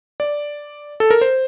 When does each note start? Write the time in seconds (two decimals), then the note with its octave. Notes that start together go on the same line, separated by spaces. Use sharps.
0.20 D5
1.00 A4
1.10 A#4
1.21 C5